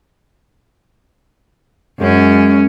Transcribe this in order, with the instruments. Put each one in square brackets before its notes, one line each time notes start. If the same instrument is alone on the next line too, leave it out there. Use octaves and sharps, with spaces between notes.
[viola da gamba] F#2 C#4 [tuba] G#3